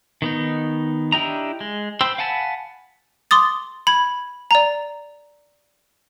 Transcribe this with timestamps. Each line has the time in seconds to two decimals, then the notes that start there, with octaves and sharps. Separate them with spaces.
0.22 D#3 B3 D#4
1.12 D4 E4 G4 D#5 A#5
1.60 G#3
2.01 C5 G5 B5 C6 E6
2.18 F5 F#5 G#5 A5 B5
3.31 C6 D6 D#6 A6
3.87 B5 G#6
4.51 D5 A#5